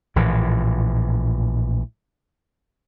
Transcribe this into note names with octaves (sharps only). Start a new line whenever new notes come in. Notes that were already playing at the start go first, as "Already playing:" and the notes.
A#1 A2 E3